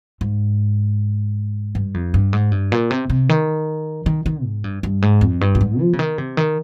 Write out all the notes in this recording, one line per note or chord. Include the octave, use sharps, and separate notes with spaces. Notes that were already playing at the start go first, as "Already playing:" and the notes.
G#2
G2
F2
G2
G#2
G2
A#2
C3
C3
D#3
D#3
D#3
G#2
G2
G2
G#2
F2
G2
A#2
G#2
F3
C#3
D#3
C3
D#3